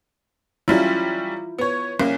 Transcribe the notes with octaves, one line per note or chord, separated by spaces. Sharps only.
F#3 G3 C#4 E4 F4
B3 C#5
C2 A#3 C#4